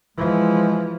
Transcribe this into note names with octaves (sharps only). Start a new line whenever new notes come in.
E3 F3 G#3